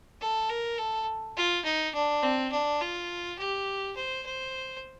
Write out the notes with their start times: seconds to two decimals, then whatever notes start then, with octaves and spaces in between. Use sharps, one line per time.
0.21 A4
0.49 A#4
0.78 A4
1.36 F4
1.65 D#4
1.94 D4
2.23 C4
2.52 D4
2.81 F4
3.39 G4
3.96 C5
4.26 C5